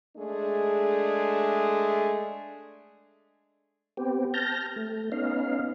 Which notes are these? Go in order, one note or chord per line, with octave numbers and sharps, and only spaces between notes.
G#3 A3 D4 G#4
B3 C4 G4
A5 F6 G6 A#6
A3
B3 C#4 D#4 F5